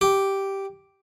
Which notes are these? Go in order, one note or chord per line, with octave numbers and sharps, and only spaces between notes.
G4